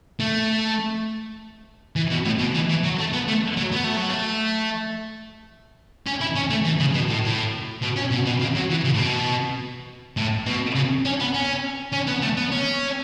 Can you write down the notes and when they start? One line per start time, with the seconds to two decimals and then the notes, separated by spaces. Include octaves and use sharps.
0.20 A3
1.96 E3
2.10 B2
2.25 A2
2.40 B2
2.54 E3
2.69 E3
2.84 F#3
2.99 A3
3.13 B3
3.28 A3
3.57 F#3
3.72 B3
3.84 A3
3.97 F#3
4.10 A3
6.06 C#4
6.21 E4
6.36 C#4
6.50 A3
6.65 E3
6.80 C#3
6.94 B2
7.09 A2
7.25 A2
7.82 B2
7.97 C#4
8.12 B2
8.26 B2
8.41 C#3
8.55 F#3
8.70 E3
8.85 C#3
8.95 A2
8.99 B2
10.17 A2
10.46 B2
10.75 C#3
11.05 C#4
11.20 B3
11.34 C#4
11.93 C#4
12.07 B3
12.22 A3
12.37 B3
12.52 C#4